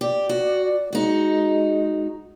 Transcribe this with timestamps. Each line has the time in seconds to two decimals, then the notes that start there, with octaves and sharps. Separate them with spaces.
0.01 G4 D5
0.29 F#4
0.93 G#3 D#4 F#4